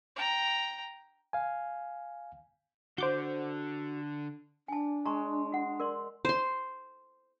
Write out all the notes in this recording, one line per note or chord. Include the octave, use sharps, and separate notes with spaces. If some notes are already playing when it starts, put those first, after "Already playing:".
G5 A#5
F5 G#5
D3 F#4 C5 D6 G6
D4 G#5 A5
G#3 A#5 C#6
F#4 F#5
A#4 D5 C6
C5 C6